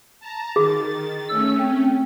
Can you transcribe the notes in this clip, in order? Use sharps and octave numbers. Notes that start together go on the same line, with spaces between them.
A5 A#5
D#3 G#4 A6
A3 C#4 E6
C4